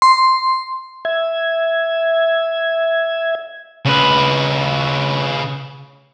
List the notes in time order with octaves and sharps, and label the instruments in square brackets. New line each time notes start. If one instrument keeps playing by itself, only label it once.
[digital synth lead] C6
[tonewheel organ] E5 G#6
[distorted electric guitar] C#3 B4